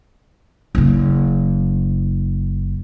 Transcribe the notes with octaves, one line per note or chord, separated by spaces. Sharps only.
F#1 C#3